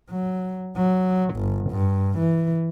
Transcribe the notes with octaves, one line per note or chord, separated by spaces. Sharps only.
F#3
F#3
G1
G2
E3